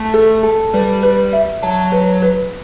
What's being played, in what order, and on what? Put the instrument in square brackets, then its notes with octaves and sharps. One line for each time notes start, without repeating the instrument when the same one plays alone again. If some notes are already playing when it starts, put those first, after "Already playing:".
Already playing: [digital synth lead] A3 [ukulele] A5
[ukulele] A4
A4
[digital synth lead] G3 [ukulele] B4
[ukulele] B4
E5
[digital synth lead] F#3 [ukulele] A5
[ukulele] B4
B4